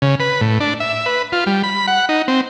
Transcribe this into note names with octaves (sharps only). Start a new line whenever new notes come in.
C#3
B4
A2
D4
E5
B4
F4
G3
B5
F#5
D#4
C4